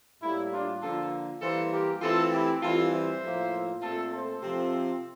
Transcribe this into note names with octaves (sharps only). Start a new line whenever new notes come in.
A2 G3 A#3 E4
D4 F4
D3 F3 A#3 F4 A4
E3 G3 A#3 A4 C5
G4 A#4
E3 A3 C4 F4 A4
E4 G4
E3 G3 C4 F4 A4
C5 E5
A2 F3 A#3
A#2 A3 C4 F4 A4
A4 C5
C3 F3 C4